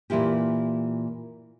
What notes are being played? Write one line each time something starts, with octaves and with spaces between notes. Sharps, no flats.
A#2 E3 E4 F4 G4